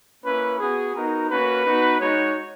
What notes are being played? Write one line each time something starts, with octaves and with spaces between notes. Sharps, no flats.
A#3 C#4 E4 B4
B3 F#4 G#4
B3 D#4 F#4 A#4
A#3 C#4 F#4 B4
B3 D#4 F#4
G#3 D#4 F#4 C#5